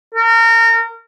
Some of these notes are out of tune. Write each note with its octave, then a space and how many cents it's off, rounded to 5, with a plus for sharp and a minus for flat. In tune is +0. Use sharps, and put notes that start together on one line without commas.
A#4 -30